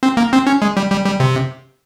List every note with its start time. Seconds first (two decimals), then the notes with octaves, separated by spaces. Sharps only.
0.03 C4
0.17 A#3
0.33 C4
0.47 C#4
0.62 G#3
0.77 G3
0.91 G3
1.06 G3
1.20 C3